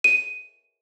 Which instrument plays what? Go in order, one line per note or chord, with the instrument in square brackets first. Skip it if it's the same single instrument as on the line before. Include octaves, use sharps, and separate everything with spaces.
[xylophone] D#7